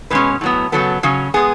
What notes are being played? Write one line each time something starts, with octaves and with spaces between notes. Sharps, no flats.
B2 G#3 C#4 B4
A2 F#3 B3
C#3 F#3 B3 A4
C#3 F#3 C#4
G#3 B3 G#4